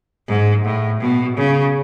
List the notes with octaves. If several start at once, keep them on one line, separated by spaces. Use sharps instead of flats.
G#2
A2
B2
C#3